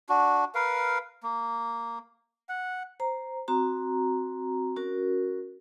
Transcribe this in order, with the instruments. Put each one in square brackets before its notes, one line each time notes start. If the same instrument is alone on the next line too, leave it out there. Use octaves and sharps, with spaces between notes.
[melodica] D4 F#4
A#4 B4 F5
A#3
F#5
[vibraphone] C5 A#5
C4 F#4 A#5
C#4 F#4 A#4